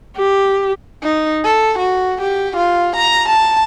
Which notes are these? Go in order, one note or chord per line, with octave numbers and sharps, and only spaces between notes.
G4
D#4
A4
F#4
G4
F4
A#5
A5